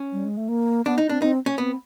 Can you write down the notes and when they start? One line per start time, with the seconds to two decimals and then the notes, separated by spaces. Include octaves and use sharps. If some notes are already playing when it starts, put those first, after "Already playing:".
Already playing: C#4
0.12 G3
0.25 G#3
0.37 A3
0.49 A#3
0.86 B3 D4
0.98 D#4
1.09 C4 D4
1.22 C4 D#4
1.46 C#4
1.58 B3 C4